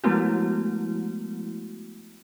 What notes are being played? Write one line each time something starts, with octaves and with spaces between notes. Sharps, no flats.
F3 G#3 A3 B3 E4 F#4